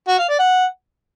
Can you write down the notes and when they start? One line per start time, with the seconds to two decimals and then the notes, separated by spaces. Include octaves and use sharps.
0.08 F#4
0.19 F5
0.29 D5
0.39 F#5